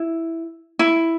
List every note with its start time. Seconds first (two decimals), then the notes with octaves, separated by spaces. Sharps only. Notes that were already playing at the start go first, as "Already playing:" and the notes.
Already playing: E4
0.79 E4